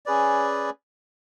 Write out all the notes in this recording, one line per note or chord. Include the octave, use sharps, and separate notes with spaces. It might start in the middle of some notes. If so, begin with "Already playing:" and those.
C#4 G#4 B4 D5